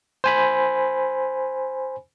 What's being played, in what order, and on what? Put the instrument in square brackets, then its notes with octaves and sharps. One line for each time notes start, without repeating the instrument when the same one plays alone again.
[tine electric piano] C5 G#5 B5